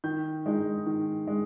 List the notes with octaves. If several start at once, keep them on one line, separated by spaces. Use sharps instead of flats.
D#3 G6
G#3 D#4
D#3
G#3